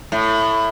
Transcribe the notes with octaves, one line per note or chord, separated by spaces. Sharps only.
A2